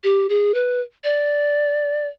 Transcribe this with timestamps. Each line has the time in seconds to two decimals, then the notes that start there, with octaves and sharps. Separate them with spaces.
0.04 G4
0.29 G#4
0.54 B4
1.04 D5